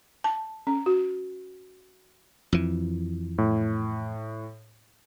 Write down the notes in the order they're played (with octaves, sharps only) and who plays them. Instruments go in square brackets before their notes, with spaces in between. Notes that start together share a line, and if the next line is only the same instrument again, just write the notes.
[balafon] A5
C#4
F#4
[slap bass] F2 E3
[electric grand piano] A2